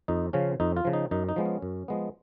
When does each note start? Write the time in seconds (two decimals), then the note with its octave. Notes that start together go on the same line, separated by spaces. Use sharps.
0.08 F2 D#4
0.33 C#3 F3 C#4
0.60 F2 D#4
0.76 F4
0.85 C#3 F3
0.93 D#4
1.11 F#2 D#4
1.29 D#4
1.36 F3 G#3 B3
1.45 C#4
1.62 F#2
1.88 F3 G#3 B3